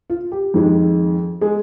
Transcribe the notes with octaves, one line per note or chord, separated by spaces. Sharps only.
F4
G4
F2 D#3 G#3
G#3 G#4